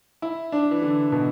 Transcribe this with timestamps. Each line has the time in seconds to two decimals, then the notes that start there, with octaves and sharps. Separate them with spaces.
0.22 E4
0.52 D4
0.71 E3
0.82 D3
1.12 B2